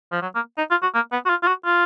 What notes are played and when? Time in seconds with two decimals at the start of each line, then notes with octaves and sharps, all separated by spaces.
0.12 F3
0.22 F#3
0.35 A#3
0.58 D#4
0.71 F4
0.83 F#4
0.95 A#3
1.12 B3
1.26 F#4
1.30 F4
1.43 F4
1.47 F#4
1.65 F4